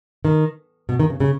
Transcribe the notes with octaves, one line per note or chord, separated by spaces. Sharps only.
D#3
B2
D#3
C#3
C#3